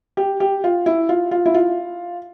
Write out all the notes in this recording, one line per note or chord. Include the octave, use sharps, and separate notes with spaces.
G4
G4
F4
E4
F4
F4
E4
F4